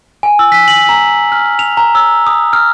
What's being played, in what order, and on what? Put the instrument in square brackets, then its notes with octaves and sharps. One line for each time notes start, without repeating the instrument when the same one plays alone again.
[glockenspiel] G#5
E6
B6
F#7
A#5
F6
F7
A#5
E6
D#6
F6